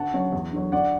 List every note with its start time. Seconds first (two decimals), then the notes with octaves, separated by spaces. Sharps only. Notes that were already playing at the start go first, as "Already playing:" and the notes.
Already playing: D2 F#5 A5
0.14 C#3 F#3
0.33 E2
0.53 D3 F#3
0.72 D2 D5 F#5